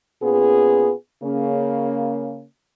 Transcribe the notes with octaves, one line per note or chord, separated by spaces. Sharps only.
A#2 B3 C#4 F4 G#4
C#3 A#3 C#4